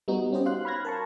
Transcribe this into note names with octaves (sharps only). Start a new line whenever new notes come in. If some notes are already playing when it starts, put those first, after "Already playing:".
G3 B3 D#4 F#4
C#4 D#4 G4 C5 D#5
F#4 F5 C6 F#6
B5 C6 F6 F#6 G#6 A#6
A#4 A5 C#6